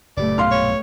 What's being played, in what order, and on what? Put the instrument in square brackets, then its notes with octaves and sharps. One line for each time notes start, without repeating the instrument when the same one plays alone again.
[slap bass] F#1 A#2 [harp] A3 G4 B4 [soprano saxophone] D5
[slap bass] B1 G2 A#2 [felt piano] F5 C6 F6
[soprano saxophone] C#5